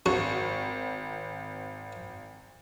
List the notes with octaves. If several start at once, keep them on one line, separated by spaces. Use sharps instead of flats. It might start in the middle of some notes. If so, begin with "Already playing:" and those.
G#1 F#4